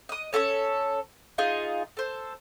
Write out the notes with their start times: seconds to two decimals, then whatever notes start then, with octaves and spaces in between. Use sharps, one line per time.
0.09 D#5 D#6
0.33 C#4 F4 A4 C#5
1.38 D#4 F4 G#4 D#5
1.97 A4 C5